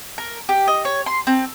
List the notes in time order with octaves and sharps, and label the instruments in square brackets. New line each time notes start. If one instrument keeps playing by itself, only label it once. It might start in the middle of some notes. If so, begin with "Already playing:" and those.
[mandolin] A#4
G4
D#5
C#5
C6
C4